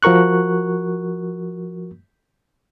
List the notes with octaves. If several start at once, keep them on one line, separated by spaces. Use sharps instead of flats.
F3 F#4 A#4 C#6 F#6